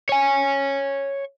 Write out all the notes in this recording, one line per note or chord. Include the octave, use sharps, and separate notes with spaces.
C#5 G#5